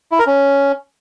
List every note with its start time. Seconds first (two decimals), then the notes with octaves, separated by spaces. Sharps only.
0.12 E4
0.19 A#4
0.27 C#4